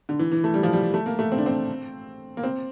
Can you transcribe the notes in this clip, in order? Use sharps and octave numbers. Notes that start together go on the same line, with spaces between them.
D3
E3
E3
A3
G3
F3
G3
A3
A#3
A3
C4
D4
C4
A#3
C4